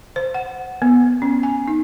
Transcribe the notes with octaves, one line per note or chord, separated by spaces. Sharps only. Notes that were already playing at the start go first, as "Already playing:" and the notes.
C5
F#5
B3
C#4
G#5
D#4